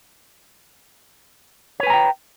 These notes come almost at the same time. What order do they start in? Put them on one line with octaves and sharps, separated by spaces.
C#5 B4 G#5 A#5 G5